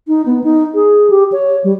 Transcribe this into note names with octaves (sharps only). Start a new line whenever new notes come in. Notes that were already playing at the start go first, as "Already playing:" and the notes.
D#4
B3
D#4
G#4
G4
C#5
G3